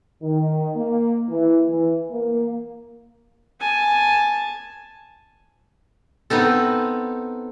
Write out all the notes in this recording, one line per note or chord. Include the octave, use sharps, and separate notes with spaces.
D#3
A#3
E3
E3
A#3
G#5 A5
B3 C4 D#4 A4